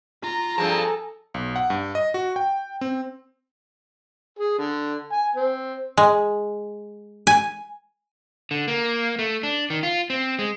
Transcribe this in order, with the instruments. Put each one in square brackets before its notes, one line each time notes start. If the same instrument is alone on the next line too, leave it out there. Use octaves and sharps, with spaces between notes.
[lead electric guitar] F4 [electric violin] A#5
[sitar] G2 F3 C4 [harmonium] G#4 A4 [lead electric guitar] A5
[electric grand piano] B1
F#5
G2
D#5
F#4
G5
C4
[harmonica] G#4
D3
G#5
C4
[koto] G#3
G#5
[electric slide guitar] D3
A#3
A3
D4
D#3
F4
C4
G#3